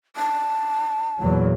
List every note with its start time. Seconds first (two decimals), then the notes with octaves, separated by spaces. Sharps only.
0.16 A5
1.20 E2 A#2 F#3